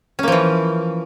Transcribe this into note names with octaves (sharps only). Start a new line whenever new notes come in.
E3 F3 A#3 C#4